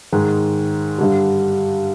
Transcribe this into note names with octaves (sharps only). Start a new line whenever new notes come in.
G#2 D#3 G#3
G2 D3 G3